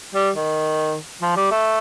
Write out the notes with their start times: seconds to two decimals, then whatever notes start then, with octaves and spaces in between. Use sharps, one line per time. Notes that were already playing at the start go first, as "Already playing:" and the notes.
0.15 G3
0.36 D#3
1.22 F3
1.36 G3
1.51 A3